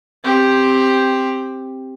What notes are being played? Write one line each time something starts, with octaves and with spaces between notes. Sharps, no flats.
C4 G4